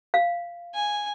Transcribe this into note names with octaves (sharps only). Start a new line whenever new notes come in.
F5
G#5